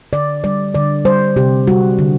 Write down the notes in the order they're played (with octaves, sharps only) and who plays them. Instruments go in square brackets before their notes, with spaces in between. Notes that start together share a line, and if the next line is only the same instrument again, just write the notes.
[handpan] D3 D5
G3 D5
D3 D5
G3 C5
C3 G4
G3 F#4
D3